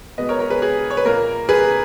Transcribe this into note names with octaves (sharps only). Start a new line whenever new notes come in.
B2 G#3 B3 B4 D#5
A#4 C#5
A#4 C#5
G#4 B4
G#4
C#5
B4
A#2 A#3 A#4
G#4 B4